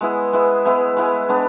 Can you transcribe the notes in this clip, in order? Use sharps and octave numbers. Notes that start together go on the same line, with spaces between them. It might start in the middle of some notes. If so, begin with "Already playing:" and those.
G#3 B3 E4 G#4
G#3 B3 E4 G#4
G#3 B3 E4 G#4
G#3 B3 E4 G#4
G#3 B3 D4